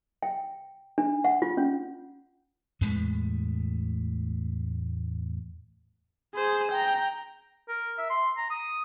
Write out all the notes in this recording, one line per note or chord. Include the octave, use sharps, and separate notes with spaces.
G5
D4
F#5
F4
C#4
E2 A2 G#3 A3
G#4 C5
G5 A#5
A#4
E5
C6
A#5
D#6